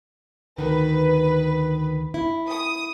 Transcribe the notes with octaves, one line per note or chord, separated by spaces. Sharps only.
D2 D#3 B4
E4
D#6